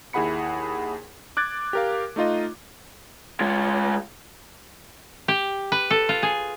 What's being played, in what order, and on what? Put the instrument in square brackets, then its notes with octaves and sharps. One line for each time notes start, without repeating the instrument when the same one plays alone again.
[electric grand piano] D#2 E4 G#4 F#5 B5 C#7
D6 F#6 G#6 A6 D7
G4 A#4 F5
A3 D#4 F4 D#5
[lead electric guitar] G#3 F4
[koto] G4
B4
A4
F4
G#4